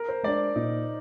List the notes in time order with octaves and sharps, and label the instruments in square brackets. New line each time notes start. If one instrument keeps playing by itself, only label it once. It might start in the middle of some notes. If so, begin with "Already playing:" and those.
Already playing: [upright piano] A#4
C5
[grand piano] G#3 D4 [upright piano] D5
[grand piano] A#2 [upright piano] D#4